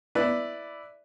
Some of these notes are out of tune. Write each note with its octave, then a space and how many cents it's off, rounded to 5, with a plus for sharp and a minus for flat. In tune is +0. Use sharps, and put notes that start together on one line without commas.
E4 +0 B4 +0 D5 +0